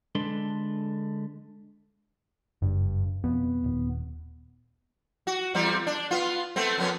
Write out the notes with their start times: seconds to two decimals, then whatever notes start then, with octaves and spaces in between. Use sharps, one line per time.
0.15 D3 G#3 D4 A4 B4 C6
2.62 F#1 G2
3.24 F2 B2 B3
3.64 D#1
5.27 F#4
5.55 E2 G3 C4
5.87 D4
6.11 B3 F4
6.56 A3 B3 C4
6.78 F2 B3 C#4